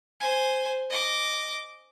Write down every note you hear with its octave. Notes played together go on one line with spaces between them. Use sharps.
C5 G#5
D#5 D6